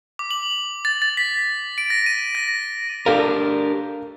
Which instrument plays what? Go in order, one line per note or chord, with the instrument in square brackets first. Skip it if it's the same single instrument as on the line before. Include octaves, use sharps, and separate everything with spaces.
[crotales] D6
F#7
A6
A6
B6
D7
A#6
D#7
A#6
[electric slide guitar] D4 G4 A#4 [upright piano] A4 F5